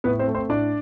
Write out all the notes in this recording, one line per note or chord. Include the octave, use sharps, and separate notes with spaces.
A2 B3 B4
C4 C5
A3
C4 C5
A2 D4 D5